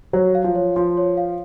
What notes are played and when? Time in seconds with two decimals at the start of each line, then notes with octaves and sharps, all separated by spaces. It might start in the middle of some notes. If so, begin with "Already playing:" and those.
0.13 F#3 C#5
0.35 F5
0.44 F3
0.55 C#5
0.76 F3 C6
0.97 C#5
1.17 F5